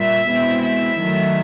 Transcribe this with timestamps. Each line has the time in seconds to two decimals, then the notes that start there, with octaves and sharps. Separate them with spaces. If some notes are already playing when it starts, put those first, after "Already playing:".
Already playing: A#2 G3 E5
0.28 B2 G#3 C4 E4
0.63 E5
0.99 D#3 F#3 A3